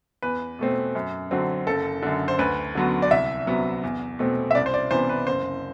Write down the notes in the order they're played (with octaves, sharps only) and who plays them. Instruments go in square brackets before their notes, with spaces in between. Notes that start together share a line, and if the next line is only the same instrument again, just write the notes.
[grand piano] E2 B4
B2 A3 C4
F#2
D3 F#3 C4
F#1 A4
F#2 D3
C5
D2 B4
D3 F#3 B3
D5
C2 E5
C3 F#3 B3
E2
B2 A3 C4
E5
C2 D5
C5
D5
C3 E3 B3 C5
B4
F#1 C5